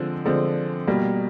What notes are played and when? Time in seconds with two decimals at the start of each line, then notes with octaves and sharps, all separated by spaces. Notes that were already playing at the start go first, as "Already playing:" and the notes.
Already playing: D3 F3 G#3 C4
0.25 D3 F3 G#3 C4
0.88 B2 G3 A#3